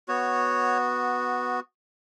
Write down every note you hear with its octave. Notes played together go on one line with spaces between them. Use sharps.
B3 F#4 C#5